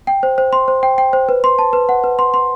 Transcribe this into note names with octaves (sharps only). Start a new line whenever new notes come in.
G5
C5
C5
C6
C5
G5
G5
C5
B4
C6
A5
B4
F#5
B4
C6
C6